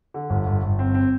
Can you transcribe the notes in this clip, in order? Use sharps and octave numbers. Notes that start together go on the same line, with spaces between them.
D3
G1
G1
G1
C4
C4